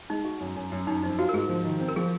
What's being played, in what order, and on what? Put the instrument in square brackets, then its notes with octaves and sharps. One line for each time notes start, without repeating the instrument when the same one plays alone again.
[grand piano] G#3 [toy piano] D#4
[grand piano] F#4
F#2
F#2
F#2
[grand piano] F#2 [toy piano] D#4
[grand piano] F2 [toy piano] D#4
[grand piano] F4 [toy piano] F#4
[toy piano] A#4
[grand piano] G#2 [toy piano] G#4
[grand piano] F3
D#3
C4
[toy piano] A#4
[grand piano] F3 [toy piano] G#4